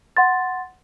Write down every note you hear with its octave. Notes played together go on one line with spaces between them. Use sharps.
F#5 C6 A6